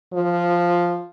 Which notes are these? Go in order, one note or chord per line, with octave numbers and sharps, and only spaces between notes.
F3